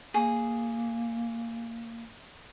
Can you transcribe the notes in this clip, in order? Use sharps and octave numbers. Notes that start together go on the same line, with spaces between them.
A#3 G#4